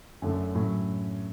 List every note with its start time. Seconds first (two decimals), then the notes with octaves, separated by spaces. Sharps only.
0.22 F#2 D3 A3 D4
0.55 A2 F#3 C#4